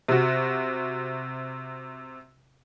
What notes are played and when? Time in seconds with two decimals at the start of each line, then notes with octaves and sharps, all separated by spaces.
0.08 C3 F#4